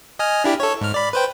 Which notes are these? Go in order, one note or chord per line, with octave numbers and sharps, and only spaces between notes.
D#5 G#5 F6
D4 E4 G4
A4 C#5
G#2 F6
D5 B5
B4 C5 G5